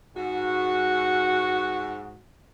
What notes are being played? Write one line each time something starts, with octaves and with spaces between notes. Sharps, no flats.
G#2 F#4